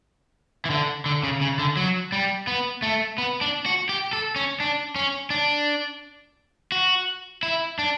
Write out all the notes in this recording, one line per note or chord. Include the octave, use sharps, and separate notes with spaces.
E3
D3
D3
C#3
C#3
D3
F#3
G3
B3
A3
B3
D4
F#4
G4
A4
C#4
D4
C#4
D4
F#4
E4
D4